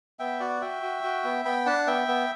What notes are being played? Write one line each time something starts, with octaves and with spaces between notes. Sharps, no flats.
B3 E5 G5
F#4 D5 F#5
F#4 E5 G5
F#4
F#4
B3
B3 G5 B5
D4 F#5 A5
B3 E5 G5
B3